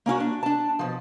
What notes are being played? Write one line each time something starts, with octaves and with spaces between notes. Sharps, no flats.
A#3 C#4 F4 F#4
D4
D4 A5
B2 F3